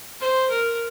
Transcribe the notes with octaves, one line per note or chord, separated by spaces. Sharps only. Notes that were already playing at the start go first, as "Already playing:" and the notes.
C5
A#4